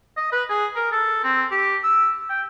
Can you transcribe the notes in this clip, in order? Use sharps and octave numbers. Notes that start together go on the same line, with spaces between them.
D#5
B4
G#4
A#4
A4
C4
G4
E6
G5